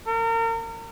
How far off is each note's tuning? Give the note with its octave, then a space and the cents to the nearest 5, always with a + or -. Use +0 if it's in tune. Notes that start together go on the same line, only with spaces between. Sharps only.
A#4 -35